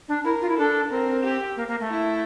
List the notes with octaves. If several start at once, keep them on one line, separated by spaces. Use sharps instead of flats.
D4
E4 A#4
F4
E4
D4 A4
C4 A#4
G4
A#3
A#3
A3
E4